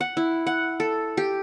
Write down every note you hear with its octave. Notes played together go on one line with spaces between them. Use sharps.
F#5
E4
F#5
A4
G4